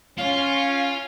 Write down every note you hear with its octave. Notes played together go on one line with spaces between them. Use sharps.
C#4 F4 F5